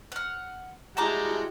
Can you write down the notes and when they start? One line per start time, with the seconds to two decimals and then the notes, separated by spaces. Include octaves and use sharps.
0.12 F#5 F6
0.97 G3 G#3 E4 F#4 G5 A5 A#5 D6